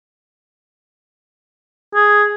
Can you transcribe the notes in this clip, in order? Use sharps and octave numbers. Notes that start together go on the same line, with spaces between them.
G#4